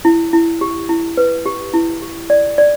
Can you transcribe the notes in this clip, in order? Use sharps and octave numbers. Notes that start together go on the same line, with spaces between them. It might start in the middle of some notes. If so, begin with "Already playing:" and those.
E4
E4
G4
E4
B4
G4
E4
G4
D5
D5